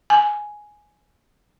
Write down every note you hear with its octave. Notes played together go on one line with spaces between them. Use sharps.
G#5